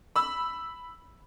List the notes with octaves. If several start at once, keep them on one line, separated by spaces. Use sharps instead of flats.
B5 E6